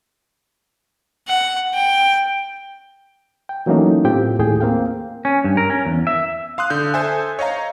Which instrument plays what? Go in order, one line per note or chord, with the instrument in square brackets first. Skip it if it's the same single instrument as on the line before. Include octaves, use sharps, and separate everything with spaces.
[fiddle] F#5
G5
[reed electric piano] G5
E3 F#3 A3 A#3 C#4 D#4
A2 C4 F4 G4 G5
D#2 A2 G#4 G5
A#3 C4 F5 G5
[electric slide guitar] C#4
G2
A#4
C#4
E2
E5
[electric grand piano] F5 C6 D#6 F#6
D3 G6
A4 C5 E5 G#5
C#5 D#5 F5 A#5